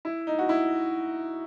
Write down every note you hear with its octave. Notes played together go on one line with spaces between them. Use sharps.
E4
D#4
F#4
E4